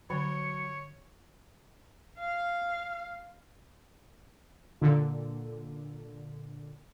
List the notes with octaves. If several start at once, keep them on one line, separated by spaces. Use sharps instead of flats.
D3 F#3 C#5 C#7
F5
A#2 D3